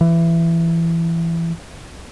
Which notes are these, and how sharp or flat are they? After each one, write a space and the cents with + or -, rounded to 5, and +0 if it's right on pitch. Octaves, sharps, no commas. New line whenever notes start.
E3 +20